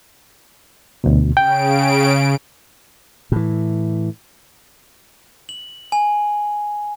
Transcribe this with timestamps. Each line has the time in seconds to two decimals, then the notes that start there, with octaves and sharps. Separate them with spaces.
1.04 D2 B2
1.37 C#3 G5 D7
3.32 A2 E3
5.49 F#7
5.92 G#5